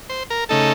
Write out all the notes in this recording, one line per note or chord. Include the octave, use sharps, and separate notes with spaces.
C5
A#4
C#3 A3 D#4 A4